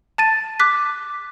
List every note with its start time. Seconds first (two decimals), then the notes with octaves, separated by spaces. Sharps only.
0.18 A5 A6 D#7
0.60 D6 F#6 B6